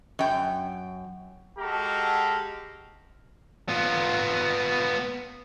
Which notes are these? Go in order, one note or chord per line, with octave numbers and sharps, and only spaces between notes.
F#2 G5
G#3 F#4 G4 A4 F5 A#5
B3 F4